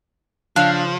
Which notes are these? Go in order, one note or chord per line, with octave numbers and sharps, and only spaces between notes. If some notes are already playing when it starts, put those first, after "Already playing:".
C#3 F3 D4 F5 C#6 E6